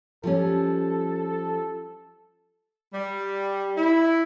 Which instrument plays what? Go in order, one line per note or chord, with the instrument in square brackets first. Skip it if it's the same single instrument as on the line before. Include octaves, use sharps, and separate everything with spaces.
[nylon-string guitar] F3 G3 C#4 [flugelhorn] A4
[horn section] G3
E4